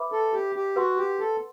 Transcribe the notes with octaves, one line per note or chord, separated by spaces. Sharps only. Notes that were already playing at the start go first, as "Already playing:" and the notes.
Already playing: B4 E5 B5 D6
A4
G4
G4
F#4 B4 F#5 C6
G4
A4